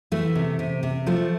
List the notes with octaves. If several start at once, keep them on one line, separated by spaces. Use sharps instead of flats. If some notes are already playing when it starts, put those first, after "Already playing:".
E3 A3
C3
C3
C3
F3 A3